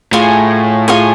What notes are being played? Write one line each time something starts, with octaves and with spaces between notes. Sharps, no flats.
A2 F4 G#4 C#5 G#5
F4 G#4 C#5 G#5